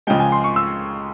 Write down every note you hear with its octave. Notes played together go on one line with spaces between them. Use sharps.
C#2 C#3 F3 G#3 G5
G#5
C6
C#6
E6